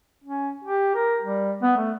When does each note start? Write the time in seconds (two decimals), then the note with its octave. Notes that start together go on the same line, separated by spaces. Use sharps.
0.24 C#4
0.64 G4
0.95 A#4
1.22 G3
1.62 B3
1.77 A3